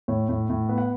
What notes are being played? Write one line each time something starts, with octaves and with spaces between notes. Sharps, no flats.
A2 C#5
A2
A2
B3
F#5